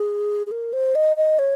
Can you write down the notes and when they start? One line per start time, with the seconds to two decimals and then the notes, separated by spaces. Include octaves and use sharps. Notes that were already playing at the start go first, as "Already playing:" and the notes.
Already playing: G#4
0.47 G#4
0.51 A#4
0.73 C5
0.95 D#5
1.17 D#5
1.39 C#5